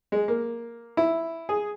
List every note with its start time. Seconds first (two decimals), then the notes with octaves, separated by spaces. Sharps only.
0.12 G#3
0.28 A#3
0.97 E4
1.49 G#4